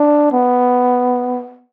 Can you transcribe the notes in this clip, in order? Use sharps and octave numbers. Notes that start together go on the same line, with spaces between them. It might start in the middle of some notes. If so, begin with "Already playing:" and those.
Already playing: D4
B3